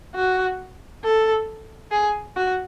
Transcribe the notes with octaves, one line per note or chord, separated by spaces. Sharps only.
F#4
A4
G#4
F#4